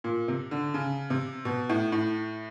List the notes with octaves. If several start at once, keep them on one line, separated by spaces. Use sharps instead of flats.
A#2
C3
D3
C#3
C3
B2
A2
A2